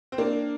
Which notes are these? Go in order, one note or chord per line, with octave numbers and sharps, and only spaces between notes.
C4
A#3 D4